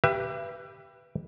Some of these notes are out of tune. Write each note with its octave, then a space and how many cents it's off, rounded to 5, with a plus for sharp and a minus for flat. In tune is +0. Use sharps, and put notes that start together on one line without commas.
G4 +0 B4 +0 E5 +35